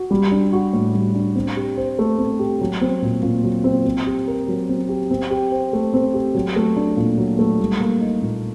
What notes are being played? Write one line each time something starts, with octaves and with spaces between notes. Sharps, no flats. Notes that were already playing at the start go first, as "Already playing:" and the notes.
Already playing: F#4
G3
D4
F#4
A2
G3
D4
C4
G4
C5
A3
C4
G4
F#3
C4
A#2
A#2
F#3
C4
C4
G4
A#4
F#3
C4
G4
C4
G4
C5
A3
C4
G4
F#3
A3
D4
A#2
F#3
A3
G3
A#3
D#4
A#2